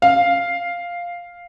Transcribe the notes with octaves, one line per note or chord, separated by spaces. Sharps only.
F5